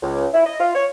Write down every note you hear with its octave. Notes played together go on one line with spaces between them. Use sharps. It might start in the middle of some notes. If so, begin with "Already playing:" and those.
C#2
E4
D#5
F4
C#5